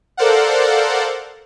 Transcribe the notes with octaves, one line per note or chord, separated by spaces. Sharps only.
A4 A#4 C5 D5 F5 F#5